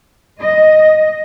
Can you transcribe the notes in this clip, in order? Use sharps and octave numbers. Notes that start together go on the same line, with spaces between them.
D#5